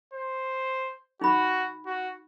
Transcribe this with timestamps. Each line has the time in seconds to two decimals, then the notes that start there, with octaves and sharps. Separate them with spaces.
0.14 C5
1.21 D#4 F#4 B5
1.86 F#4